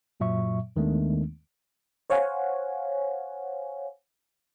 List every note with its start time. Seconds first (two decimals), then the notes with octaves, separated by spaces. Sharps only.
0.20 F#2 A#2 F#3 E5 C#6
0.76 D#2 D#3 G#3 A3 B3 D4
2.10 C5 C#5 F5 F#5 G#5